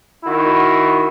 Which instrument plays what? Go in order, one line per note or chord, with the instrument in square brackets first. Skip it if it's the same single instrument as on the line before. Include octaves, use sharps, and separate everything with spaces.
[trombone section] D#3 E4 F#4